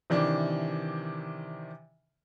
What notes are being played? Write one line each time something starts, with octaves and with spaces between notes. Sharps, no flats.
C3 D#3 E3 D4